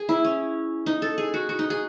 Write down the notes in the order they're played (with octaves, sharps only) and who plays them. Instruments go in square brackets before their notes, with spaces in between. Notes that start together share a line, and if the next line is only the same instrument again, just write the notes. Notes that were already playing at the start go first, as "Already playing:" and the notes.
Already playing: [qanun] G#4
E4
C#4
D#4
A4
G#4
F#4
F#4
D#4
G#4